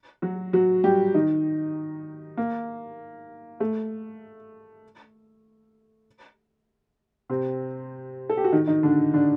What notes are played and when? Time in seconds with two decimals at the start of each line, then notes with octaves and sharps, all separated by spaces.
0.22 F#3 F#4
0.53 F#3 F#4
0.84 G3 G4
1.14 D#3 D#4
2.37 A#3
3.60 A3
7.29 C3 C4
8.30 A4
8.37 G4
8.44 F#4
8.52 D#3 D#4
8.67 D#3 D#4
8.83 D3 D4
9.13 D3 D4